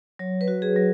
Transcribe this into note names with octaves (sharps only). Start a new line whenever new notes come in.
F#3 C#5
B4
F#4
G#4
F#3